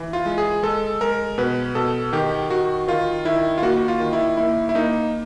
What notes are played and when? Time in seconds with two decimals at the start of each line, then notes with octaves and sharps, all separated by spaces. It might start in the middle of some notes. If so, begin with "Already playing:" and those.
Already playing: E3
0.13 F4
0.26 G#3
0.38 G#4
0.63 G#3 A4
1.01 G#3 A#4
1.38 B2 B4
1.75 B2 A4
2.13 D#3 G4
2.50 D#3 F#4
2.88 D#3 F4
3.25 D#3 E4
3.58 F4
3.63 A#3 F#4
3.88 F4
4.00 D#3
4.13 E4
4.37 A#3 E4
4.69 E4
4.75 A#3 D#4